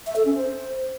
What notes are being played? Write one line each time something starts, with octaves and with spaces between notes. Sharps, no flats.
E5
A4
C#4
C5